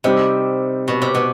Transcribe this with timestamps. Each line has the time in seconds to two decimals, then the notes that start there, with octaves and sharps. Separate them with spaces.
0.04 C3 G3 C4 D#4
0.88 B2
1.02 C3
1.15 B2